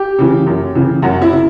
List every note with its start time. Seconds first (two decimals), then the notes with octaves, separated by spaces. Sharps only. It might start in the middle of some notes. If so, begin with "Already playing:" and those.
Already playing: G4
0.18 C#3 E3
0.46 F#2
0.75 C#3 E3
1.02 F#2 F#4
1.22 E4
1.31 C#3